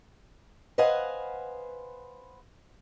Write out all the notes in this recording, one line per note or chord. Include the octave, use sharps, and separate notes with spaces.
B4 C5 D#5 F5 F#5 G#5